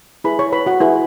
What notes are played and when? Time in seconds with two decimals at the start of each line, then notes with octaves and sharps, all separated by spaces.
0.24 E4 G#4 B4 B5
0.39 C#5 C#6
0.52 B4 B5
0.66 F#4 F#5
0.80 E4 G#4 B4